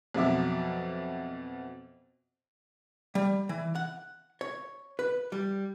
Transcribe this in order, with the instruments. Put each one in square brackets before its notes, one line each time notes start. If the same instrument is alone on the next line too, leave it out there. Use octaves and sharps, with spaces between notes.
[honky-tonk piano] F2 B2 F#3 E5 D6
[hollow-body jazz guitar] G3
E3
F#5
C#5
B4
G3